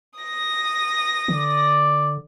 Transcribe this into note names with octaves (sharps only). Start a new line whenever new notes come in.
D#6 A#6
D3 D5